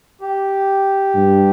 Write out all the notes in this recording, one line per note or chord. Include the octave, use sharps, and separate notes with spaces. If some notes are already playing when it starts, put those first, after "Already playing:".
G4
G2